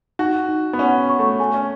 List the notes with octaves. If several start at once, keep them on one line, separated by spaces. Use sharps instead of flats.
D#4 F#4
D#4
B3
C#4 F#5
C#6
A3
A3 G#5
C#4